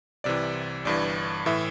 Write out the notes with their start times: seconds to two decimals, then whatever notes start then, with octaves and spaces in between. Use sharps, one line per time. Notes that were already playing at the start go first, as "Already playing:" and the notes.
0.24 C2 C3 E3 D5
0.85 G1 G2 E3 D5
1.46 A2 E3 E5